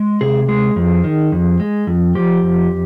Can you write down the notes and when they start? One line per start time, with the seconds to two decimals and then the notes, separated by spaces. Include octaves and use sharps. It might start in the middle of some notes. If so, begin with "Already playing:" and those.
Already playing: G#3
0.21 C3 G#4
0.48 G#3 G#4
0.76 F2
1.04 D#3
1.32 F2
1.60 G#3
1.87 F2
2.15 F3 G4
2.43 F2